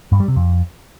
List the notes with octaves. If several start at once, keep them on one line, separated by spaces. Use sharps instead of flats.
G2
G3
C3
F2